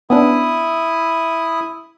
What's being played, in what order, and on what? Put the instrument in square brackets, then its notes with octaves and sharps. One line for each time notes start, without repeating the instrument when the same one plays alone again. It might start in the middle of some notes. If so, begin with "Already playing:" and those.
[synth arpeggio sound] B3 C#4 D4 [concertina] E4 D#6